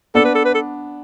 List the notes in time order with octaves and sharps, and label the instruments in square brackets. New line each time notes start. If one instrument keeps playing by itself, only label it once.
[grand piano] B3 D4 [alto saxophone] A4
[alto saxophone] B4
A4
B4
A4